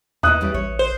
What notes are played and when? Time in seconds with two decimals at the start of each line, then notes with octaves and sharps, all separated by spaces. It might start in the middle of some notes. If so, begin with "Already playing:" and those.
0.23 D#2 D#4 E4 B4 D#6 F#6
0.41 E3 G3 C#4
0.54 A1 C#5
0.79 C5